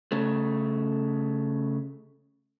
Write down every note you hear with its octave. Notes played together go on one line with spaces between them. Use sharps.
C#3 A3